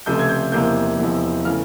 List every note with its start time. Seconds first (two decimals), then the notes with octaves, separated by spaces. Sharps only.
0.06 C#2 C3 F3 A3 G6
0.19 G#6
0.29 G6
0.52 E1 E2 C3 F3 A#3 G6
0.99 E1 E2 C3 F3
1.45 C#3 E3 A3 F6